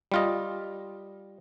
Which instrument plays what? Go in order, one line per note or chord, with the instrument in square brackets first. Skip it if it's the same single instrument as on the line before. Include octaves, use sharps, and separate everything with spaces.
[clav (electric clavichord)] G3 F4 D#5